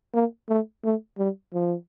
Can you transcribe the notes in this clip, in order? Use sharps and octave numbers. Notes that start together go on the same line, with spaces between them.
A#3
A3
A3
G3
F3